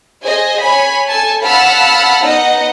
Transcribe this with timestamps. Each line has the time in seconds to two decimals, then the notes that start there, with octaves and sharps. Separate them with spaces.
0.24 G#4 C5 D#5 G#5
0.60 C#5 G#5 B5
1.09 A4 G#5 A5
1.42 F5 F#5 A5 B5 E6 F6
2.23 B3 D#4 D#5 F#5